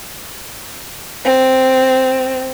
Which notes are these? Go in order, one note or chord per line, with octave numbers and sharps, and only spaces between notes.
C4